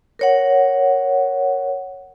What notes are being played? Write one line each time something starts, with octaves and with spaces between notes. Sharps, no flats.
A#4 C#5 F#5